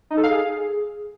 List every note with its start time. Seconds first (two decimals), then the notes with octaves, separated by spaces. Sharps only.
0.11 D#4
0.17 A4
0.23 F5
0.30 G#4